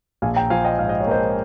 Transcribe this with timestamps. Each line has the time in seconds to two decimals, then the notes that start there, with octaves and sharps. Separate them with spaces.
0.22 A#1 F5 G#5
0.36 G5 A#5
0.50 F3 F5 G#5
0.64 D#5 G5
0.79 G#2 F5
0.89 D#5
1.00 C#5
1.07 A#3 C5 D#5